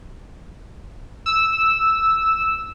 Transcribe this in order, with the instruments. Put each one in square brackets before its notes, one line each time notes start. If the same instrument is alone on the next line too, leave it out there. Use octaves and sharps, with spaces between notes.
[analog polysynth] E6